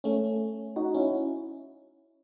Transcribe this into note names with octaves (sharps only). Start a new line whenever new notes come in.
A3 C#4
D#4 F#4
C#4 E4